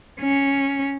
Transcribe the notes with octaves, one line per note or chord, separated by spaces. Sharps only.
C#4